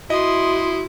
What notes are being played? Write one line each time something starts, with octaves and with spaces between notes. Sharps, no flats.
E4 F#4 D#5 C6 D#6